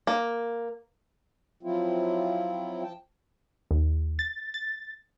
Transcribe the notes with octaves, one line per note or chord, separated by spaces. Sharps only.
A#3
F3 F#3 C4 E4 F4
F3 G5 A5
D#2
A6
A6